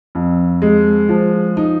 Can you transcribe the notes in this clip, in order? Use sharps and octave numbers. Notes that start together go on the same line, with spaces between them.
F2
G#3
F3
D#4